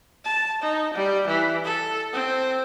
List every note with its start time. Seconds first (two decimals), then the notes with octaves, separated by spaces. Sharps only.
0.25 A5
0.63 D#4
0.95 G3
1.28 E3
1.65 A4
2.13 C4